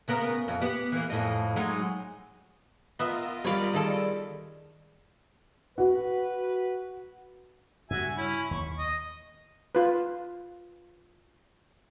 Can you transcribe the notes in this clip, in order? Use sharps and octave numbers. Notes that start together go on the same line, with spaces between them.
C#3 B3 A#4
F2
B3 G4
E3 A#3
F2 A2 D#5
F#3 G#3 D#4
B3 F4 A#4 D#5 E5
G3 C#5 D5 F5 B5
D#3 G#4 A4 D5
F#4 B4
G2 C#3 G3 F#4 E5 G#5
C#4 E4
D#2 C#6
D#5
F4 B4